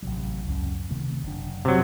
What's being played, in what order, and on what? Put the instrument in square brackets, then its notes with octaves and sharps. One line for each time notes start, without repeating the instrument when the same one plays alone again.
[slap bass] A1 C3 F#3
C#2 F#2 C#4
C3 D#3 A3
F#1 D4
[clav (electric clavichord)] C3 F#3